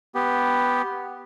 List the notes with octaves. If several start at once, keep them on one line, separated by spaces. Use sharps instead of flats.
B3 G4